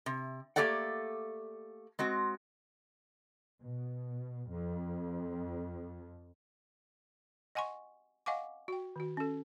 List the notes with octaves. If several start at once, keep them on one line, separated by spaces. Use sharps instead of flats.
C3
A3 A#3 G4 A4 D5 F#5
G#3 C4 F#4
B2
F2
D#5 F#5 G#5 C6 C#6
D#5 F5 F#5 G#5 C#6 D6
F#4 G5
D#3 F#4
C#4 A4